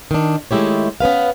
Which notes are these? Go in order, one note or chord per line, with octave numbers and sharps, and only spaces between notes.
D#3 D4
D#3 G#3 A3 E4 G4 C#5
B3 C#4 B4 F5